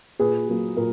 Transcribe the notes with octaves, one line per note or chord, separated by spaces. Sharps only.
A#2 G#4 B4
F#3 A#3
A#2 A#4